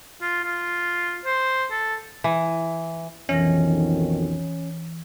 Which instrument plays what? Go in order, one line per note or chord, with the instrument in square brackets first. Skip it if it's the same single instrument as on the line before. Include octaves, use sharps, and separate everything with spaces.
[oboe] F4
F4
C5
A4
[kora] E3
[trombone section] B1 F2 D#3 [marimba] E3 A#6 [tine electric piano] C#4